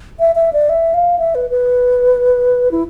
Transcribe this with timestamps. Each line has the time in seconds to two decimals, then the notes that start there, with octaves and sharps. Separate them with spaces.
0.20 E5
0.35 E5
0.53 D5
0.69 E5
0.94 F5
1.18 E5
1.35 B4
1.50 B4
2.71 E4